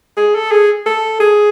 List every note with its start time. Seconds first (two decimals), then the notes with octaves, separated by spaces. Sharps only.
0.17 G#4
0.35 A4
0.52 G#4
0.86 A4
1.20 G#4